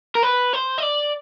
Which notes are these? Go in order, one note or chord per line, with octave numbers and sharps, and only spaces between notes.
A#4
B4
C5
D#5
D5